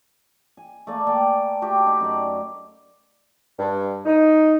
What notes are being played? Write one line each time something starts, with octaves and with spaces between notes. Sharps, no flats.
G#5
A3 A#3 D5
A4 D5 G5 G#5
A3 F#4 G4 G5
D#4 B5
F#2 D5
G2
D#4